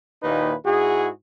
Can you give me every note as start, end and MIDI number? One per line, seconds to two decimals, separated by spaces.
0.23 0.54 39
0.23 0.54 46
0.23 0.54 51
0.23 0.54 63
0.23 0.54 64
0.23 0.54 71
0.66 1.08 44
0.66 1.08 64
0.66 1.08 66
0.66 1.08 68